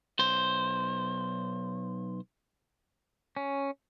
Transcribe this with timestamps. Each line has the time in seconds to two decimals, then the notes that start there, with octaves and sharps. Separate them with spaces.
0.19 B1 C5
3.37 C#4